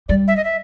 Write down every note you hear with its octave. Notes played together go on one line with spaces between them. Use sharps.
G3 D5
E5
D#5
E5